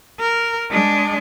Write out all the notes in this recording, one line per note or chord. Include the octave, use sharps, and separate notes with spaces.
A#4
G#3 D4